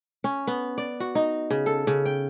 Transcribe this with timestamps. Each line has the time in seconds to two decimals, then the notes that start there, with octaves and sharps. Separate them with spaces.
0.24 C#4
0.47 B3
0.78 D5
1.00 F#4
1.15 D#4
1.51 C#3
1.66 A4
1.87 C#3
2.05 G5